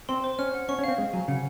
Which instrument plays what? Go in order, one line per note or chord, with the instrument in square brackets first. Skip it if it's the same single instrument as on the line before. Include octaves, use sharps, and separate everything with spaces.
[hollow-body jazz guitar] C4 [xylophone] C6
[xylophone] C5
[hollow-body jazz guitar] C#4 [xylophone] F6
[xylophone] F#5
[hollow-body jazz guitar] C#4 [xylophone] C#6
[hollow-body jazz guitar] C#4
[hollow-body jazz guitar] C4 [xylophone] F5
[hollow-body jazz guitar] G#3 [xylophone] F5
[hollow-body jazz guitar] F#3 [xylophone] G#5
[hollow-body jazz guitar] C#3 [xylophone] F#5